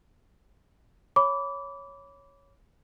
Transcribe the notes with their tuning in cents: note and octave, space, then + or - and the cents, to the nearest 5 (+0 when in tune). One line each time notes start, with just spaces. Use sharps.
C#5 +0 B5 +0 D6 -25